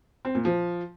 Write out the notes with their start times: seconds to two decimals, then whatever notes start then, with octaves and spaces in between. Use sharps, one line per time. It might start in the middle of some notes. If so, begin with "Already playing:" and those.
0.25 C4
0.35 A#2
0.45 F3